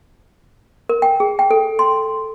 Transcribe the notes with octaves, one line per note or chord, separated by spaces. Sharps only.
A#4
G5
G#4
G5
A4
C6